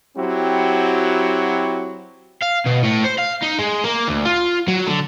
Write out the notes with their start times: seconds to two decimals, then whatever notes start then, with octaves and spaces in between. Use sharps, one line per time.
0.17 F#3 C4 E4 F#4 G4
2.42 F5
2.66 B2
2.83 A2
3.04 C5
3.18 F5
3.42 D#4
3.59 G#3
3.84 A#3
4.08 D2
4.26 F4
4.68 F#3
4.87 D3